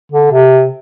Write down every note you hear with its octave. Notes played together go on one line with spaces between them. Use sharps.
D3
C3